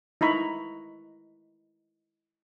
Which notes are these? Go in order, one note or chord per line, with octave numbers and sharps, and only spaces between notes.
D#4 E4 A#5 B5 C#6